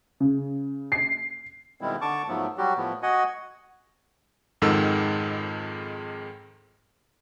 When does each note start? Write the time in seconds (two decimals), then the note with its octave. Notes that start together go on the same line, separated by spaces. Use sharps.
0.20 C#3
0.92 C7
1.81 B2 D#3 G3 G#3 C4 E4
2.01 D3 A5 C#6 D6
2.28 G#2 F3 F#3 A3 B3
2.58 F#3 G3 F#4 G4
2.77 A2 F3 B3
3.03 F#4 D#5 F#5 G#5
4.62 F2 G#2 D#3 G#3 A4 E6